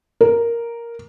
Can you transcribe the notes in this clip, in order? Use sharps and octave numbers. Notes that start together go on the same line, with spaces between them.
A#4